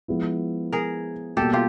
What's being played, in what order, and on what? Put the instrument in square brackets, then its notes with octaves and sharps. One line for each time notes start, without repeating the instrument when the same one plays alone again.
[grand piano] F3 G#3 B3 E4
[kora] G#4 A#4
[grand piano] B2 G3 A#3 [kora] G4 A4
[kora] F4 G4